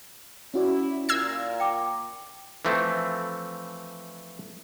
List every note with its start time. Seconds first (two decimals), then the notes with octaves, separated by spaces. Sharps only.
0.54 C#4 E4 F#4 D5
1.09 A#2 E6 G#6 A#6 C7
1.60 G5 D6
2.65 E3 F3 A3 C4